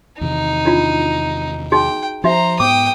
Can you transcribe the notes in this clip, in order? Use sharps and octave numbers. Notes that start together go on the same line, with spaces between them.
E2 C3 D#3 D#4
D4 E4 F4
D#4 F#4 G#4 G5
F3 D#4 F#4 C5 E5 A#5
G#2 B3 G5 D6 D#6